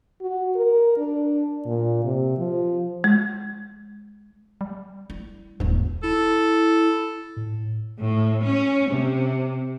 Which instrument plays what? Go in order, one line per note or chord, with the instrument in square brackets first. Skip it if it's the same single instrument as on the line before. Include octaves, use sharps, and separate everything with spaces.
[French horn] F#4
A#4
D4
A#2
C3
F3
[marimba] G#3
[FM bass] G3
[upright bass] E4
[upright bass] D#1 C#2 [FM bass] G#2
[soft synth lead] E4 [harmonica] A4
[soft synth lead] A2
[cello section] A2
C#4
C3